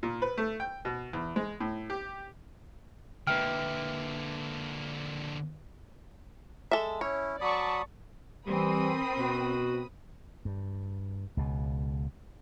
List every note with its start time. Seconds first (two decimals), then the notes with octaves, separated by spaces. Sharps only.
0.03 A#2
0.22 B4
0.38 A3
0.60 G5
0.85 B2
1.13 E2
1.36 G#3
1.60 A2
1.90 G4
3.27 D3 A#3 B4 E5 G5 F6
6.71 G#3 A4 E5
7.01 C#4 E4 C#5
7.41 F#3 D5 A5 B5 C#6 D#6
8.47 E3 G3 C4 A#4 B5 D#6
9.18 B2 F#4
10.45 G2
11.37 C#2 B2